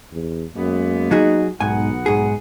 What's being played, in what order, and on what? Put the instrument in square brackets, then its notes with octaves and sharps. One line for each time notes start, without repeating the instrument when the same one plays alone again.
[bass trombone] E2
[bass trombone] F#2 [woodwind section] G#3 A#3 B3
[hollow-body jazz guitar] F#3 F#4 G#4 [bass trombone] D#4
[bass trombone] B1 [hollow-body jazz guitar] G#2 G#5 [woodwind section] B3 D#4 F#5
[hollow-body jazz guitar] G#2 G#4